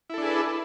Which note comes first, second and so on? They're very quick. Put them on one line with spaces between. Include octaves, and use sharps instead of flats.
E4 A4 D4 G#4 B4